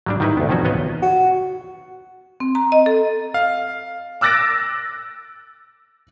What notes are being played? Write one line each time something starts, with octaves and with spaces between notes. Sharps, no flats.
F#3 G3 D4
D#3 G3 D#4 E4 B4
D2 B3
D#3 F3 C4 C#4 F#4
B3 F4 B4 C#5 D#5
F#4
C4
A#5
D#5
A4
F5
D6 E6 F#6 A6 A#6 D7